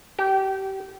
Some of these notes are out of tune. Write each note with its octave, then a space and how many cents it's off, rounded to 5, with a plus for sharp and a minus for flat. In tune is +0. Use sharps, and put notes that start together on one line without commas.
G4 -25